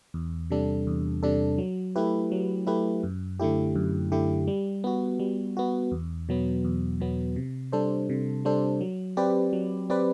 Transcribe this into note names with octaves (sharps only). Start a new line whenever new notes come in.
E2
C3 G3 D4 A4
E2
C3 G3 D4 A4
F#3
A3 E4 G4 B4
F#3
A3 E4 G4 B4
F#2
D3 A3 E4 G4
F#2
D3 A3 E4 G4
G3
B3 F#4
G3
B3 F#4
E2
B2 F#3 B3
E2
B2 F#3 B3
C3
G3 D4 A4 C5
C3
G3 D4 A4 C5
F#3
C4 G4 B4 D5
F#3
C4 G4 B4 D5